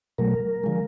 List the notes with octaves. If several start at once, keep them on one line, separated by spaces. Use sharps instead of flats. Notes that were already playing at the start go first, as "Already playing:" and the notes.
B2 F#3 A3 A#4
D3 F3 G#3